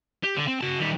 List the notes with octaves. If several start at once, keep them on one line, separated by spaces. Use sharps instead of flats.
G4
D3
C4
F#4 A5
D#2 G3